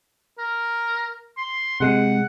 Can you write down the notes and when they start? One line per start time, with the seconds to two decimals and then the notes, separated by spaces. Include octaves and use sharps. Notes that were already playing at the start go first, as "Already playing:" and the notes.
0.38 A#4
1.37 C6
1.80 C3 G#3 F#5